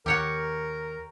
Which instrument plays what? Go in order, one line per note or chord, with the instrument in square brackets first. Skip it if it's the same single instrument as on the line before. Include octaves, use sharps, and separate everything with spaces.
[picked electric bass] D#2 [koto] G4 C#5 F#5 [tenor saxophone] A#4